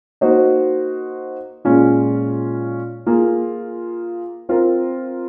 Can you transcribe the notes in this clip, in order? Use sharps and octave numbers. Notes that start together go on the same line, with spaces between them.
A#3 D#4 F#4 C5 D#5
A#2 G#3 C#4 F4
A#3 F4 G#4
C4 F4 A#4